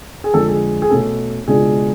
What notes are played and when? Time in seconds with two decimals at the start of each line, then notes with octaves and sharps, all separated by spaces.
0.24 G#4
0.34 F2 D3 G#3 A4
0.48 G#4
0.82 G#4
0.90 B2 A3 C#4 A4
1.47 C#2 B2 G#3 D4 G#4